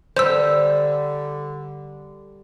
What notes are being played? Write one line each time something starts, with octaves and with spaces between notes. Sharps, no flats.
D3 G3 C5 E6